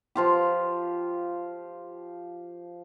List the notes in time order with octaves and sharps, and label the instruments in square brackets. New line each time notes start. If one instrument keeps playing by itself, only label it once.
[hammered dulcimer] F3 F4 G4